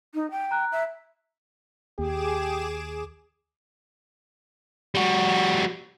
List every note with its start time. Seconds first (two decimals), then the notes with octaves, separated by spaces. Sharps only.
0.14 D#4
0.31 G5
0.51 A#5 F#6
0.72 E5
1.99 D#2 G4 G#4 D6 E7
4.95 G3 F#4